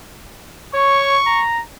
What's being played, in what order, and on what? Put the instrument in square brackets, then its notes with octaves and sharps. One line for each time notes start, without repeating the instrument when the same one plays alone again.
[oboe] C#5 [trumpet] C#6
[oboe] A#5